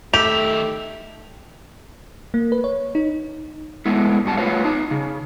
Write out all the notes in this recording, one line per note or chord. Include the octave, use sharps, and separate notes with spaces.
D#3 A3 G4 E5 F7
A#3
B4
C#5
D#4
G#3 A3 B3 E4
G2 F#4 A5
A3 F4 F#4 B4 C#5 F5
D#4 A5
C#3